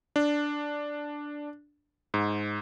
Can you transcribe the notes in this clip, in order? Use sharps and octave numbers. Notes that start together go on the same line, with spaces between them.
D4
G#2